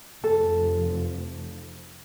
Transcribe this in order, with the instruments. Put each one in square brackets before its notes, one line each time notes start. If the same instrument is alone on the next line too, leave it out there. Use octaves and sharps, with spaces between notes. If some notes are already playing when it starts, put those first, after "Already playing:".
[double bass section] F1 F3 [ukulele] A4